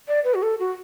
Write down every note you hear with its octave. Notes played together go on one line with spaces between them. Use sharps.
D5
B4
F#4
A4
F#4